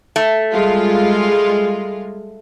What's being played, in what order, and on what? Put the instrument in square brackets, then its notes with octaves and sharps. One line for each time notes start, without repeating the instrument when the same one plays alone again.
[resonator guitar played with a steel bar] A3
[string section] G3 G#3 F4